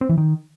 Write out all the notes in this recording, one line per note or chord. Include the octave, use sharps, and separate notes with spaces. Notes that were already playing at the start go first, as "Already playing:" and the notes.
C4
E3
D#3